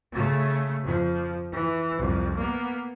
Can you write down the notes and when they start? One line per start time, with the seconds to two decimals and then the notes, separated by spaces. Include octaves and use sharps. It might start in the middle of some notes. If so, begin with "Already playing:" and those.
0.12 C#3 A3
0.82 F2 F3
1.52 E3
1.97 C2 F2
2.37 A#3 B3